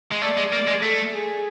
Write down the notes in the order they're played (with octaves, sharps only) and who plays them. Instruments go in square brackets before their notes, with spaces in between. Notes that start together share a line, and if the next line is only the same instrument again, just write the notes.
[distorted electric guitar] G#3
[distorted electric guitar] A3 [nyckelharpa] D5
[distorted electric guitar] G#3
[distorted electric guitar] A#3 [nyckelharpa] D5
[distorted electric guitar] G#3
[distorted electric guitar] A3 [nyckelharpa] A4
[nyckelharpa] G#4